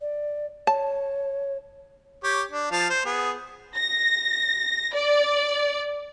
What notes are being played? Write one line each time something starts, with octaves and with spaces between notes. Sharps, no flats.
D5
C#5 A5
G4 C#5
D4
F3 F5 A5
C5
B3 G#4
A#6
D5